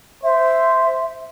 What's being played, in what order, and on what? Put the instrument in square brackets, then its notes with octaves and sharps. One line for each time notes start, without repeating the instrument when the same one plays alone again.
[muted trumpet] C5 [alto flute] E5